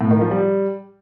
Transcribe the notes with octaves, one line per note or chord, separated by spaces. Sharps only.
A2
D#3
F3
G3